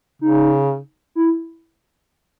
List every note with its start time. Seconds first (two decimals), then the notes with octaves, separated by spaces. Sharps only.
0.21 C#3 D#4
1.15 E4